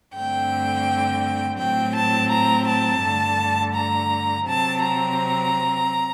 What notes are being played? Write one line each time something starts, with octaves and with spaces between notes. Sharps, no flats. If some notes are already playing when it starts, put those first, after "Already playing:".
G2 D3 A3 C4 G5
A2 F#3 C4 G5
A5
A#5
A5
G2 D3 A3
A#5
C3 F#3 C4 A5
A#5